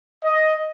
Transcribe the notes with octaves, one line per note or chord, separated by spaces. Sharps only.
D#5